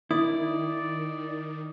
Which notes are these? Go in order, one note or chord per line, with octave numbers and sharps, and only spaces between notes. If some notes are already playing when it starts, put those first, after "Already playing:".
D#3 E4 D5 D#6